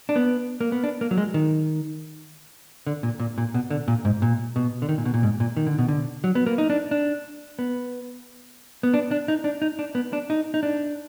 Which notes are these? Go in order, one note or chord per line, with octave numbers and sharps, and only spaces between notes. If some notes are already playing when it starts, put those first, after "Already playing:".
D4
B3
A#3
B3
D4
A#3
F#3
G#3
D#3
D3
A#2
A#2
A#2
B2
D3
A#2
G#2
A#2
B2
D3
D#3
A#2
B2
A#2
G#2
A#2
D#3
D3
B2
D3
F#3
B3
A#3
D#4
D4
D4
B3
B3
D4
D4
D#4
D4
D#4
D4
B3
D4
D#4
D#4
D4